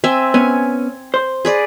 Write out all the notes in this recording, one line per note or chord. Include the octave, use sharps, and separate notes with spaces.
C4 E5 G#5
B3 C#4 G#5
C5
G#4 B4 D5